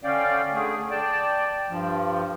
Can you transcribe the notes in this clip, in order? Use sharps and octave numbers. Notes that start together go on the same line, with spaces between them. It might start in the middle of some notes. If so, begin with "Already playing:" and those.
D3 C#4 D5 F5 G5
D3 A3 G#4
D5 G5 A5
G2 F3